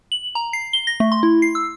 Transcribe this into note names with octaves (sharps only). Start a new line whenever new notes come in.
F#7
A#5
C7
G7
A#6
A3
C6
E4
C7
E6